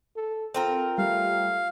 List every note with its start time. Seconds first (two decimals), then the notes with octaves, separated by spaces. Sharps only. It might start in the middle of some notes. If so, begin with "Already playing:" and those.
0.16 A4
0.54 C4 F4 A4 A#4
0.98 G3 A3 F5